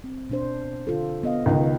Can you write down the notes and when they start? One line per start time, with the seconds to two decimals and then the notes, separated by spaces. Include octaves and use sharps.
0.04 C4
0.30 B2 D4 C5
0.87 D3 F4 A4
1.23 B3 D#5 F5
1.46 C#2 B2 D#3 D#4 A#4